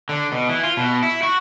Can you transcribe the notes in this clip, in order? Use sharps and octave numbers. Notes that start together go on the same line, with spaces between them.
D3
B2
E3
F4
B2
E4
F#4